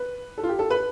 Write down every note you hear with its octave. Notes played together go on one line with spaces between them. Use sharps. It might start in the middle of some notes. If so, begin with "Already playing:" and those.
Already playing: B4
A4
F4
G4
A4
B4